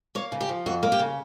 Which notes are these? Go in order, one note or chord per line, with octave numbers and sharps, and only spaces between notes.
A#3 C#5
C#3
G4
F3
F2 F#4
A#3
G4
C#3